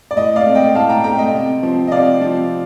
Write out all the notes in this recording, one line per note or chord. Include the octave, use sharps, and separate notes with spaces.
D5
A2 D#5
D5 F5
A3 C4
D#5 G5
A2 F5 A5
G5 A#5
A3 C4 G5 A#5
D#5 G5
C3
F3 C4
D#5
C3 D5 F5
F3 C4